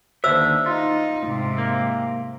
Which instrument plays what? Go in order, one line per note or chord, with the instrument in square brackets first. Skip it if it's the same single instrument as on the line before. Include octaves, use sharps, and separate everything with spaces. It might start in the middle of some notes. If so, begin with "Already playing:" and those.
[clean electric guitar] D#2 D3 E5 [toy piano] C5 E6
[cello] D#4 [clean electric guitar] F4
[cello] G#2 C3
[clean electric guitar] A#3